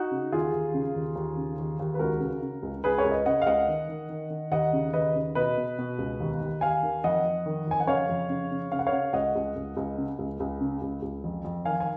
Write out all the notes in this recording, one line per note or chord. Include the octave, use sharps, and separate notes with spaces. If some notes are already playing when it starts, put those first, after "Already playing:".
Already playing: D#4 F#4
C#3
D#2 F4 G#4
D#2
C#3
D#2
D#2
C#3
D#2
D#2
B4
C#2 F#4 A#4
C#3
C#3
C#2
C#2 G#4 B4
A#4 C#5
C#2
B4 D#5
C#3 D#5 F#5
F5
C#2 D#5 F#5
D#3
D#3
D#3
D#3
D#2 D#5 F#5
C#3
D#2 B4 D#5
C#3
B2 B4 D#5
B2
B2
C#2
D#2
D#2
D#2 F5 G#5
D#3
F2 D#5 F#5
F2
D#3
F2 G#5
F#5
C#3 C#5 F5
F2
C#3
C#3
C#3 F5
F#5
C#5 F5
C#3
C#2 D#5 F#5
C#2
C#2
C#2
C#3
C#2
C#2
C#3
C#2
C#2
F2
F2
D#3 F5 G#5
G#5